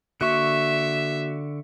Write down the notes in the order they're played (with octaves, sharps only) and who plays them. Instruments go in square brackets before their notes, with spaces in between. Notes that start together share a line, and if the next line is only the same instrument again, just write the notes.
[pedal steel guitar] D3 C#6 [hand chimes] A#3 F#4 F#6 [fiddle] E5